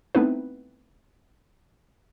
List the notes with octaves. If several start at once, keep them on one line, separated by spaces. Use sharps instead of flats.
A3 B3 C4 D#4 E4 B4